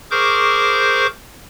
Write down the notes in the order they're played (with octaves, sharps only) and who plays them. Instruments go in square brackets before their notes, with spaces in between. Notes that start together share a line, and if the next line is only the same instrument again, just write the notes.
[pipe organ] G#4 A#4 C5 C#6 D6 G6